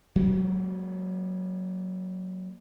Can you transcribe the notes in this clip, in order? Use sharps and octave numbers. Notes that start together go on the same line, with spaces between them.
F#3 G#3 A#3